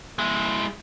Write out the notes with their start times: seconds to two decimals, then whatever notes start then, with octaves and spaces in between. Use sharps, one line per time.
0.19 G#3 E4